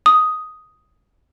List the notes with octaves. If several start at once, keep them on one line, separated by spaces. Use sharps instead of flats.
D#6